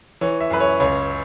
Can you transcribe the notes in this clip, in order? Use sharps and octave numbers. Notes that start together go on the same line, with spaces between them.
E3 C#5
E5
F#2 B4
C#5
C#2 C#5